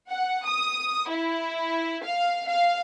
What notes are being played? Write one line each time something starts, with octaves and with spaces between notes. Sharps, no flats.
F#5
D#6
E4
F5
F5